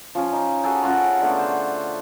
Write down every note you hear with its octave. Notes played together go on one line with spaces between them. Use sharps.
F3 C#4
D#4
F#4 G#4 A4 G#5
C#4 F4 F#4
D3 A3 B3
A4 C5